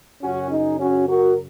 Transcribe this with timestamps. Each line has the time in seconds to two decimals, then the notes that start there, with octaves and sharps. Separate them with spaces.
0.21 F#2 C#3 C#4 F#4
0.50 D#4 G#4
0.79 C#4 F#4
1.07 F#4 A#4